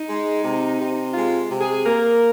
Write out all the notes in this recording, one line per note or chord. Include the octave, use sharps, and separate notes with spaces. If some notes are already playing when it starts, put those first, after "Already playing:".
Already playing: D#4
G#3
C3
C3
G#3 F4
C3
G#4
A#3 A#4